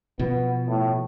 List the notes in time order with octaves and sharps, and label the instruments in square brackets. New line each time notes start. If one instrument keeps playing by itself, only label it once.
[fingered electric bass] B2 F3 [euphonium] B3
[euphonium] A2